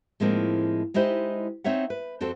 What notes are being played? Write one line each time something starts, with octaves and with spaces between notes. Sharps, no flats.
A2 F3 G#3 A#3 C4 D#4
G#3 D#4 E4 G4 C5
C4 D#4 C#5 E5 F#5
B4
F2 C4 F#4 A4 C5